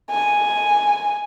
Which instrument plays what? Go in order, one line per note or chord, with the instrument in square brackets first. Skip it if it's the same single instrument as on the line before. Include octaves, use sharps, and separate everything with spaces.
[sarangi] G#5